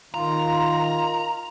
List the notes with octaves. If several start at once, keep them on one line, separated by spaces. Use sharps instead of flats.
D#3 F4 A#5